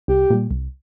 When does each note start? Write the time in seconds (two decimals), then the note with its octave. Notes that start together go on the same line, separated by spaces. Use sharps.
0.08 C2 G4
0.30 A#2 G3
0.51 C2